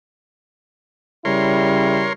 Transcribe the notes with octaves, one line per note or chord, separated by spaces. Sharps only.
C#3 G3 E4 A#4 C#5 C6